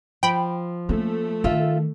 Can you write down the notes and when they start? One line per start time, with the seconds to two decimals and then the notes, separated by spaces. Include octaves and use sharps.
0.23 F3 G5 B5
0.89 A3 A#3 C#4
1.44 D#3 F4 A4 E5